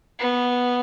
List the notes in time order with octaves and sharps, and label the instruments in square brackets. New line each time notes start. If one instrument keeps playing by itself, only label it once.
[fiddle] B3